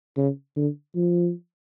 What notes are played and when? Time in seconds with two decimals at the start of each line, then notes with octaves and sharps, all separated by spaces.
0.17 C#3
0.56 D3
0.95 F3